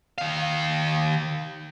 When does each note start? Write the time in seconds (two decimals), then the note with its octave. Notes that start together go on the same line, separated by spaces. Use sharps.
0.18 D#3 F5